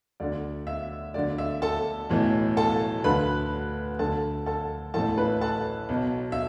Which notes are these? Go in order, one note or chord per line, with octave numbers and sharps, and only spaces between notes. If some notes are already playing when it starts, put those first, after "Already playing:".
D2 D3 D5
E5
D2 D3 D5
E5
A4 A5
B1 A2 E3
A4 A5
D2 D3 B4 B5
D2 D3 A4 A5
A4 A5
A1 A2 E3 A4 A5
B4 B5
A4 A5
B1 B2
E5